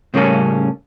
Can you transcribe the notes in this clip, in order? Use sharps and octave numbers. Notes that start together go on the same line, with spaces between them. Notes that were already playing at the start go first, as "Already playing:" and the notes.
A2 C#3 G3 A#3 C#4 A4